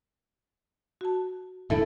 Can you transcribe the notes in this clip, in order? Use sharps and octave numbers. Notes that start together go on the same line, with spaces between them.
F#4 A5
D#1 G#2 D3 E4 A4